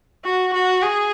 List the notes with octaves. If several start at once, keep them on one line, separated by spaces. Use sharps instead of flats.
F#4
F#4
G#4